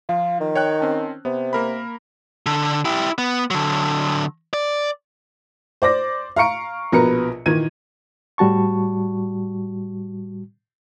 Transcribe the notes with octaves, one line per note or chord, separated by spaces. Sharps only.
F3 F4
D#3
C#5 G5 F#6
C4 C#4 A5
C3 B3
A#3 A#4 B5
D3
E4 G4
B3
D3 F#3
D5
C5 D5 D6 A#6
F5 A#5 C#6 C#7 D7
A#1 B2 A#4 B4 A#5 C#7
A#2 D#3 E3 A#3 G#6 D#7
A2 G3 F#4 A5 C#6